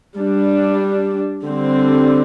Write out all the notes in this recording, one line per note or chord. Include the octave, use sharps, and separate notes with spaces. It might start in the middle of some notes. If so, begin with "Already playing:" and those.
G3 D4
D3 G3 C4